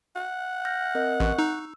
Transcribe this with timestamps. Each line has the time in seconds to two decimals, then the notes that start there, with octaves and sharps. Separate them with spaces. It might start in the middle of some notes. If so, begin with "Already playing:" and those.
0.16 F#5
0.65 F6 G6 A#6
0.95 C4 A#4 D#5
1.20 A1 C#6 F#6
1.39 D#4 E6